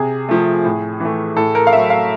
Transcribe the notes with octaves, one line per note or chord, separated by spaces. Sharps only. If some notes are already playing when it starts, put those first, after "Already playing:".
Already playing: C3 G#4
F3 A3
A2
E3 A3
A2 A4
A#4
F5
F#3 A3 E5
F5